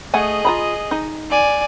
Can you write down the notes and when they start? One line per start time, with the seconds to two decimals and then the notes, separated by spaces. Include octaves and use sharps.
0.14 A3 G#4 D#5 F#5 G#5
0.45 F4 A#5 B5
0.91 D#4
1.30 D5 G#5